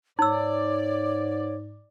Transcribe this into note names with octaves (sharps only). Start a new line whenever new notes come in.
G#2 D#4 C#5 D5 E6